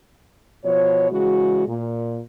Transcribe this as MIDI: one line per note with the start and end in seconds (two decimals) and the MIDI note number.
0.65 1.08 47
0.65 1.08 53
0.65 1.08 73
1.12 1.66 49
1.12 1.66 52
1.12 1.66 56
1.12 1.66 66
1.68 2.19 46